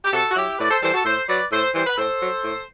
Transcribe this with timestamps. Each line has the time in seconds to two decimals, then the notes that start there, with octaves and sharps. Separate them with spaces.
0.05 G4
0.13 C3 F#4 A4
0.31 F#4
0.36 F#3 E4 G4
0.59 A2 B4 D5
0.71 A4 C5
0.82 E3 G3 A4 C5
0.94 F#4 A4
1.05 A2 A4 C5
1.29 F#3 B4 D5
1.52 A2 A4 C5
1.75 E3 G3 C5
1.86 B4
1.98 A2 A4 C5
2.22 F#3
2.45 A2